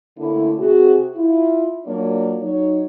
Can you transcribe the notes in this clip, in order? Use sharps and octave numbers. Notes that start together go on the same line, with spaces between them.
D3 A3 A#3 C#4 E4
C3 F#4 G#4
E4 F4
F#3 A#3 D4 F4 C#5 D5
F#3 D#4 C#5